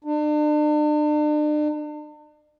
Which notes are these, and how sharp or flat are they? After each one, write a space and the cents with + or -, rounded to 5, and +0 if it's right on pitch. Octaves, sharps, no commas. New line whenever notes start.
D4 +40